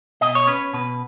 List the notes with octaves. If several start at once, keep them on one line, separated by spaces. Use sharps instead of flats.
B2 D#5
C#5
C#4 B4
B2 B4